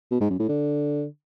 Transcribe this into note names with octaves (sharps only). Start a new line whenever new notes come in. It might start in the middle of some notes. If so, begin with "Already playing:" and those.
B2
G#2
F#2
A2
D3